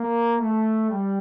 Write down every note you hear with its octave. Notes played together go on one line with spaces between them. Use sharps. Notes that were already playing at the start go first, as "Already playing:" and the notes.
Already playing: A#3
A3
G3